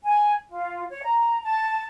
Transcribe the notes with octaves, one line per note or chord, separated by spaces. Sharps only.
G#5
F4
C#5
A#5
A5